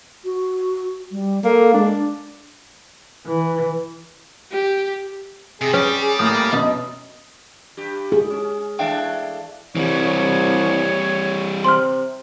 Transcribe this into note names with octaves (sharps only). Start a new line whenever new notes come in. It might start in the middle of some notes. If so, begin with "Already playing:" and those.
F#4
G3
A#3 A4
G#3 D4
E3
G4
C3 G#4
C#4 G4 D5
G#4
A2 A#3 D#6
F#2 B2 D#5
G2 G4
G#4
C#4
E3 A3 D4 E5 F5 G5
C2 E3 G3 C#5
C3 C6 F6